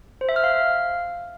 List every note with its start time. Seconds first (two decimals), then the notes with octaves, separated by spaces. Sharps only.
0.21 C5
0.29 E5
0.36 F6
0.44 F5